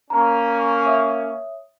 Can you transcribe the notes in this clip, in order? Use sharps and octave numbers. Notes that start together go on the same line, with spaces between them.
A#3 C#4 A#5
C#5 E5 D#6